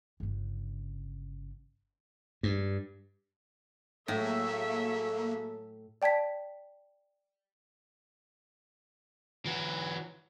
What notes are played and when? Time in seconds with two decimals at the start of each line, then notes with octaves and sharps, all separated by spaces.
0.20 G1 C#3
2.43 G2
4.08 A2 F#3 A#3 G#4 A4 E5
6.02 D5 G5 A5 G#6 B6
9.46 E3 F#3